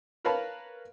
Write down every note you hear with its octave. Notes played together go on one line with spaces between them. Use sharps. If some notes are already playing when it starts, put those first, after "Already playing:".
A#4 B4 C#5 F5 A5 B5